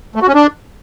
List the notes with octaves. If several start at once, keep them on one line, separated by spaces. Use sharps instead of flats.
A3
F#4
C#4
D4